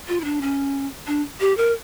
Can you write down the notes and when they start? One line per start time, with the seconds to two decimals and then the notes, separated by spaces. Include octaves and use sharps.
0.08 F4
0.20 E4
0.24 D4
0.42 C#4
1.07 D4
1.40 G4
1.57 A#4